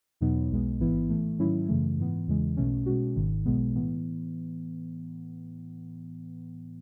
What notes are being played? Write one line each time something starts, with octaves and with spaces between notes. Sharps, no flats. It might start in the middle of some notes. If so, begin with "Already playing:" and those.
E2 B2 F#3 B3 D#4
B1 B2 G#3 B3
A1 G#2 E3 B3 E4
A2 E3 A3
G#2 D#3 F#3 C#4 E4
F#2 C#3 E3 A3
G#2 E3 B3
E2 C#3 E3 G#3
B1 B2 A3 C#4
B2 G#3 C#4 F#4
G#1 G#2 D#3
B1 B2 G#3 B3
A2 E3 B3